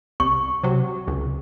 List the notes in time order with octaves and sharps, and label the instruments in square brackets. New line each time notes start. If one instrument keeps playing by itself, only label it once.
[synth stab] C2 [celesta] C#6
[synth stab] C3 F#3
C#2